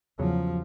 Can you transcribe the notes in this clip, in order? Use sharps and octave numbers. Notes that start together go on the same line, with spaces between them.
E2 C#3 F3 F#3